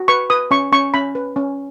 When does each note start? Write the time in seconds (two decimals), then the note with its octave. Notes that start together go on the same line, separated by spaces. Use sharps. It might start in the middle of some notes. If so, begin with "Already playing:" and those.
Already playing: F#4
0.08 B4 C#6
0.30 B4 D#6
0.51 C#4 C#6
0.72 C#4 C#6
0.94 C#4 B5
1.15 B4
1.36 C#4